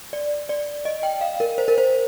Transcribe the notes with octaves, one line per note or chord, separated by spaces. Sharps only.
D5
D5
D#5
G5
F5
A#4
C5
A#4
C5